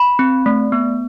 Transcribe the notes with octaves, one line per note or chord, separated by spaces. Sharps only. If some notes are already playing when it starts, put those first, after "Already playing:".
Already playing: B5
C4
A3
B3